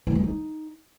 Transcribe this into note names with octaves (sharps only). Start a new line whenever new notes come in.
E3
G#3
D#4